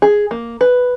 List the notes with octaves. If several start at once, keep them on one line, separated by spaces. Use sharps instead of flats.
G#4
A#3
B4